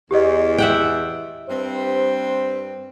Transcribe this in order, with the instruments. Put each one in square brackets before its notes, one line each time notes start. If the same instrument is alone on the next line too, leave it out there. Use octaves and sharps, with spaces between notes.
[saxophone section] E2 [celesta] G4 D#5
[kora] E5 F#5 G5
[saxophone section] G2 C4 [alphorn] C5